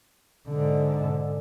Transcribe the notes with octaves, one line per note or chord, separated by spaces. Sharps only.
G#2 D3